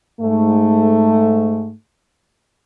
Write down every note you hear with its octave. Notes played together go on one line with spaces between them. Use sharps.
G#2 A3